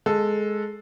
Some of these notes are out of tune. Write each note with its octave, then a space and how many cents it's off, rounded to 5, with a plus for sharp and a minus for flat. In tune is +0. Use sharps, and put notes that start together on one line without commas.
G#3 +10 A4 +0